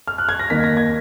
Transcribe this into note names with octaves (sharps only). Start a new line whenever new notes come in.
F6
F#6
G#6
A#6
D#2 D#3 A#3 B6
A#6
G#6